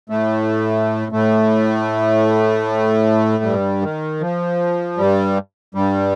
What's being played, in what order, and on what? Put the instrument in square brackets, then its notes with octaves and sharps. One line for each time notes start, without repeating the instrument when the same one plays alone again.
[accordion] A2 A3
A2 A3
G2 G3
D#3
F3
G2 G3
G2 G3